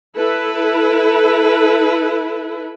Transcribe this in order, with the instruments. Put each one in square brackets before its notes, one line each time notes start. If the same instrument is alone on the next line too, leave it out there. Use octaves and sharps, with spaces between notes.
[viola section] E4 A4 B4